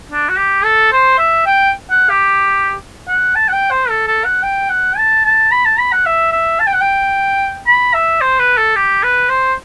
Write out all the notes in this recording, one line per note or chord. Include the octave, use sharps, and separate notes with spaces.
D4
F#4
G4
A4
C5
E5
G5
F#5
G4
F#5
A5
F#5
G5
C5
A4
A4
F#5
G5
F#5
A5
A5
B5
A5
B5
F#5
E5
E5
A5
G5
F#5
G5
B5
E5
C5
B4
A4
G4
B4
C5